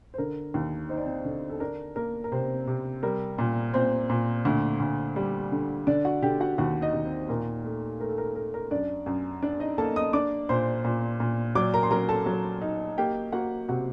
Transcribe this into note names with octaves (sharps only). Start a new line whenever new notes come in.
C5
D3 A#4
D#2
D#4 C5
D5
C4 C5
D3
A4
D4 A#4
A#3 A#4
A#4
C3 C4 C5
C3
G3 A#4
A#2
A#2 C4 C5
A#2
D2
D2
G3
D3
D3 D4 D5
F#4 F#5
D3 G4 G5
F#4 F#5
D#2 F#4 F#5
D#4 D#5
D#2
C4 C5
A#2 A#4
A3
A3 A#4
A4
A#4
A3 A#4
A#4
F#2 D4 D5
F#2
D4 D5
D#4 D#5
A#3 A4 A5
D#5 D#6
D4 D5 D6
A#2 C5 C6
A#2
A#2
F#3 D5 D6
A#4 A#5
C6
F#3 A#4 A#5
A4 A5
F#3
D#4
A#3 G4 G5
A#3 F#4 F#5
C3 F#4 F#5